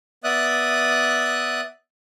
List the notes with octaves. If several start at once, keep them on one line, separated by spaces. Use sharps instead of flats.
B3 D5 E5 D#6 F#6